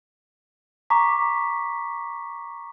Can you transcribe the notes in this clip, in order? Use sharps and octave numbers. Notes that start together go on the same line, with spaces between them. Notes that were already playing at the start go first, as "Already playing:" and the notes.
A#5 C#6 D6 B6